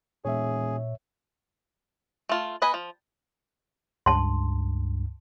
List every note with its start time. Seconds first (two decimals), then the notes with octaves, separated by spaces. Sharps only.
0.25 E1 A#2 G#4 C#5 E5
2.29 A3 F4
2.62 B3 B4 D#5 G#5 B5
2.74 F3
4.06 C#2 G2 A5 C6